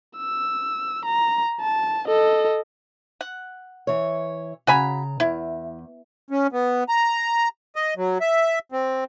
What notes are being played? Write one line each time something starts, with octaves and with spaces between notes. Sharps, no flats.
E6
A#5
A5
A4 D#5
F#5
E3 C#5
C#3 F#4 G#5 A#5 B5
E2 E4
C#4
B3
A#5
D#5
F#3
E5
C4